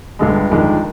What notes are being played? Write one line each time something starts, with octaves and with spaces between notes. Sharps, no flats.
G1 G2 D3 G#3
G1 F2 D#3 G#3 D4